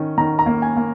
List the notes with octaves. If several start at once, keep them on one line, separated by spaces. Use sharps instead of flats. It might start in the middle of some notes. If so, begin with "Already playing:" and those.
Already playing: D#3 C#4
D#3 A#5
A#5
A#3
G#5
A#3